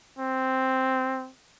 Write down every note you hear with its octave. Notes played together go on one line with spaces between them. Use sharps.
C4